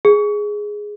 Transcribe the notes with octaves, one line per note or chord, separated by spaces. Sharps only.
G#4